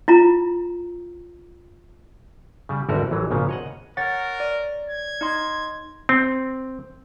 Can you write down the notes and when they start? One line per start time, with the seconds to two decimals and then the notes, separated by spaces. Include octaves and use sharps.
0.08 E4 F4 A#5
2.69 C#3 G3
2.89 G#1 D2 D3 G3 F#4 A#4
3.11 A1 E3 F#3
3.31 G#1 A#2 C#3 F3
3.49 C#5 D#5 F#5
3.97 A#4 C#5 F#5 A6
4.40 D5
4.90 G#6
5.21 D#4 D#5 C6
6.09 C4